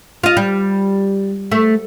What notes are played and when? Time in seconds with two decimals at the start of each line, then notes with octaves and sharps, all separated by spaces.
0.23 F4 D#5
0.37 G3
1.52 A3